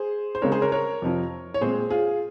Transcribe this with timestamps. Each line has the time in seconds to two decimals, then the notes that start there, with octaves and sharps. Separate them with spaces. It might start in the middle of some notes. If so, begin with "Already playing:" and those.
Already playing: G#4 C5
0.35 C5
0.42 C#3 G#3 C4 A#4 C#5
0.52 G#4 C5
0.62 A#4 C#5
0.72 A#4 C#5
1.02 F2 C3 F3
1.54 C#5
1.61 A#2 G#3 C4 G#4 C5
1.90 F4 G#4